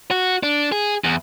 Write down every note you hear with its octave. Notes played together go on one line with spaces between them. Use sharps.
F#4
D4
G#4
E2